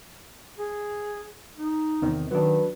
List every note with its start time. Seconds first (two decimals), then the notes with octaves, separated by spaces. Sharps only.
0.58 G#4
1.58 D#4
2.02 E2 C3 D#3
2.31 D#3 F#3 D4 B4